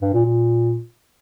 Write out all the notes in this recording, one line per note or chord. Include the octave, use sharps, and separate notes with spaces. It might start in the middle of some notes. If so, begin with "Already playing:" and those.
G2
A#2
A#2